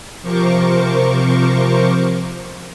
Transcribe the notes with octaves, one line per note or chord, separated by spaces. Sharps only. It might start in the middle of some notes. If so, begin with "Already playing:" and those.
C3 F3 A#4 C5 C#6 D6